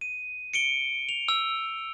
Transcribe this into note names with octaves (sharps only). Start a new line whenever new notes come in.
D#7
C#7 D7 G7
F7
E6